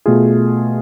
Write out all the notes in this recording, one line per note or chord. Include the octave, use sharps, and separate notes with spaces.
B2 A3 F4 G#4